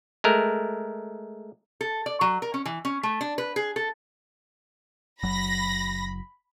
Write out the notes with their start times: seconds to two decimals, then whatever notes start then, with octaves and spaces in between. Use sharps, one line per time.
0.24 G#3 A3 A#4
1.81 A4
2.06 D5
2.21 F#3
2.42 A#4
2.54 C#4
2.66 E3
2.85 C#4
3.03 A3
3.21 D4
3.38 B4
3.56 G#4
3.76 A4
5.23 F#1 F#3 B5 A#6